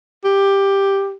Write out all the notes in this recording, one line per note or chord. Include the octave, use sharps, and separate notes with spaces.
G4